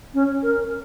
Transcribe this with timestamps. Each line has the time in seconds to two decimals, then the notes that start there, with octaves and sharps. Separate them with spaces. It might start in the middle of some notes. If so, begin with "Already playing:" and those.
0.14 C#4
0.43 A#4